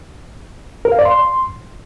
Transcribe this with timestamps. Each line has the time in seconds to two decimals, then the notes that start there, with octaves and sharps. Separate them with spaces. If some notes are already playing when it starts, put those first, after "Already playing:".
0.85 A#4
0.92 F5
0.99 D5
1.05 C6